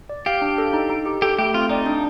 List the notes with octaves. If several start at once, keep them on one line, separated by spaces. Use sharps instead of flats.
D5
G4 F5
D4
A4
D#4
D#4
G4
G4 A4
A3 G4
C4 F4
D#4 D5
D4